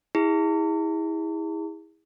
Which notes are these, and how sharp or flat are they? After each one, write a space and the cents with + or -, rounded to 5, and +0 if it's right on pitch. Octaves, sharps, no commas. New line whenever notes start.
E4 -25 G#4 -30